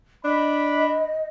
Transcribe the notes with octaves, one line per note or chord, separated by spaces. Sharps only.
D4 D#5 B5